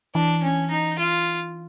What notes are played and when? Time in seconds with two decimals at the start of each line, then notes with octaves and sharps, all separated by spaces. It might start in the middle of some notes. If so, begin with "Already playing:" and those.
0.15 E3 D4
0.43 C#4
0.70 D#4
0.99 F4